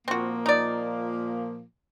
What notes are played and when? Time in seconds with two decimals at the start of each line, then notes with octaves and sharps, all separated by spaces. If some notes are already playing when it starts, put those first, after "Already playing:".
0.08 A#2 F3 A#3 C4 F#4
0.46 D#4 D5